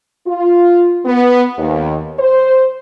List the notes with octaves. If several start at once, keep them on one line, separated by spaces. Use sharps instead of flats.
F4
B3
D#2
C5